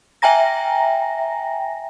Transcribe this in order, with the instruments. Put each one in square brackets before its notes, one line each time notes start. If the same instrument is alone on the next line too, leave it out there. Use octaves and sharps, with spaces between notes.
[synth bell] E5 G5 G#5 A#5 A#6